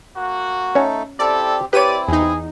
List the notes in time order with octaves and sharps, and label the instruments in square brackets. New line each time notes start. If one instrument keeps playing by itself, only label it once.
[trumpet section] A#3 F#4
[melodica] A3 D#4 A4 [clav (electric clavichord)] C#4 C#5
[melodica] C4 G4 [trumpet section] E4 A4 [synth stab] D5
[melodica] C4 E4 [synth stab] G4 D#7 [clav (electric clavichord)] B4 C#5 [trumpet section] D5
[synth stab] E2 D#4 [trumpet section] G#4